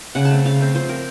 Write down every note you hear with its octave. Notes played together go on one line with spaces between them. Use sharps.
C#3 F#5
A5
A3 C4
C#3 F5
A3 C4
F3 C5
C4 A#4